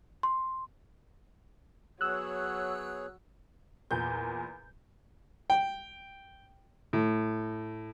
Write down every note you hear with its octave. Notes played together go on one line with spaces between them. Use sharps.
C6
F#3 B3 G#4 C#5 E6 F#6
E2 A#2 G6
G5
A2